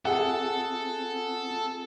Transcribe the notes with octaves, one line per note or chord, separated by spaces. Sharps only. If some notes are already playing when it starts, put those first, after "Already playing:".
C4 F4 G#4 A4 F#5